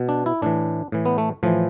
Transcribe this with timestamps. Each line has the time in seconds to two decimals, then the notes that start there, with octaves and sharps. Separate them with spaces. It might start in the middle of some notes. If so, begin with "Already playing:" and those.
Already playing: B2
0.09 D4
0.26 E4
0.42 A2 E3 D4
0.92 A2 E3
1.05 B3
1.18 A3
1.43 A2 E3 F3